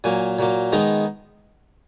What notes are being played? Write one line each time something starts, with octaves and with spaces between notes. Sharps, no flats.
A#2 F#3 A#3 G#5
A#2 F#3 A#3
D#3 G#3 B3 D#4 A#5